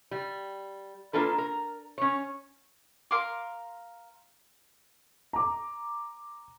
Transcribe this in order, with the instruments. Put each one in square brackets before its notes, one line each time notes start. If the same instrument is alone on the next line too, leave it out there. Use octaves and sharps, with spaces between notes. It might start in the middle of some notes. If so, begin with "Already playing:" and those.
[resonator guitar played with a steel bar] G3
A#3 D4 F4 A4 B4
A#4
C#4 C#5
[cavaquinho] A#4 F5 C6 D6
[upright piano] A#5 D6